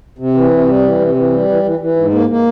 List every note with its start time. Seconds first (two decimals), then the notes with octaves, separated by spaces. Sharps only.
0.19 C3
0.34 E3
0.50 C3
0.67 G3
0.83 E3
1.00 C3
1.15 E3
1.32 G3
1.48 E3
1.63 E3
1.80 E3
1.96 G#2
2.12 A#3
2.29 A#3